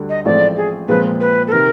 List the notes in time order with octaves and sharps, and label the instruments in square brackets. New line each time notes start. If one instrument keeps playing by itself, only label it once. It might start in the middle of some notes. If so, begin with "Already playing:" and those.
Already playing: [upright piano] D2 D3 G3
[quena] D#5
[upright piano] A1 A2 F3 G#3 C4 [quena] D5
[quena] G#4
[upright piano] A#2 F3 G#3 C4 [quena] B4
[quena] B4
A4
[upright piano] C3 D#3 [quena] A#4